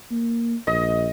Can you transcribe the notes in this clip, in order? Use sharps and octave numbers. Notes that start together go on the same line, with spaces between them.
A#3
A#1 D#5